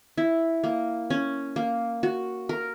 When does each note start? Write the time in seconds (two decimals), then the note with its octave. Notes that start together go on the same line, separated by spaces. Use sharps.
0.18 E4
0.64 A#3
1.10 C#4
1.56 A#3
2.03 F#4
2.49 A#4